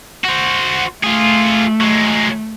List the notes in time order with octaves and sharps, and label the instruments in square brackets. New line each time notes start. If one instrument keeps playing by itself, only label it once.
[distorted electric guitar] F#4 C5
[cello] A3 [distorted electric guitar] F4 G#4
[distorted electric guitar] F#3 G#3